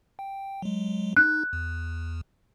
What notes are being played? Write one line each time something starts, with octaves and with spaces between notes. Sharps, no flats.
G5
F#3 G#3
D#4 F#6
E2